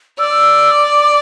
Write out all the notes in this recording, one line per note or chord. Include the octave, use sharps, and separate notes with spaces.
D5 E6
D6